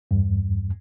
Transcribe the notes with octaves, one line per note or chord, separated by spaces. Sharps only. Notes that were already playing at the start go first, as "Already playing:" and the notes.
E2 G2